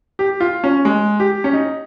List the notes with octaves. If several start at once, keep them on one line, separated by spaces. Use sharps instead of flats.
G4
F4
C#4
G#3
G4
C#4
D#4